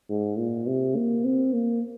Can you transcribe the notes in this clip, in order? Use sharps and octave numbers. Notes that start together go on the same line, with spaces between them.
G#2
A#2
C3
A#3
C4
A#3